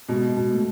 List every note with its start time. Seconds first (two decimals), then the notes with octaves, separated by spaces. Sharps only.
0.09 B2 G#3
0.37 B2
0.51 A3